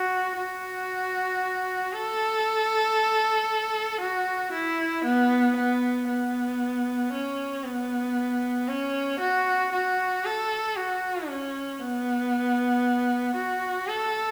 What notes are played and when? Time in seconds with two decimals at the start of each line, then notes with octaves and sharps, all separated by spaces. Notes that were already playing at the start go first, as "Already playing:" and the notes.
Already playing: F#4
0.37 F#4
1.93 A4
4.01 F#4
4.52 E4
5.05 B3
5.57 B3
6.08 B3
7.13 C#4
7.64 B3
8.68 C#4
9.20 F#4
9.73 F#4
10.25 A4
10.76 F#4
11.28 C#4
11.80 B3
13.35 F#4
13.88 A4